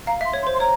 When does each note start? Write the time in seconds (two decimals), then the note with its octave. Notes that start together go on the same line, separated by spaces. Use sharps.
0.07 F5 A#5
0.21 E5
0.25 C6
0.33 C#5
0.43 C6
0.47 C5
0.54 C6
0.60 C#5 A#5